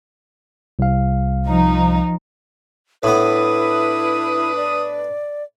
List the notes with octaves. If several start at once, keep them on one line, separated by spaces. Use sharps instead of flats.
C2 F5
F3 D#4
A2 B3 D4 E4 B4 D#6
D5